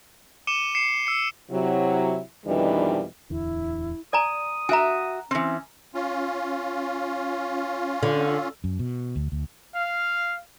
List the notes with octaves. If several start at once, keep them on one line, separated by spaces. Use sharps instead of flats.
D6 C#7 D#7 E7 G7
C7 C#7 E7
E6 C#7
C3 F#3 E4
F2 B2 D#3 E3 G3 D4
D1 E2 D3 E4
D5 G#5 A#5 D#6
F#4 E5 G#5 A#5
E3 C4 C#4
C#4 F4
D3
F#2
B2
D2
D2
F5